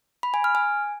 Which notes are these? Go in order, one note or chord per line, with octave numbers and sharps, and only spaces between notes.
B5
G#5
F6
G#5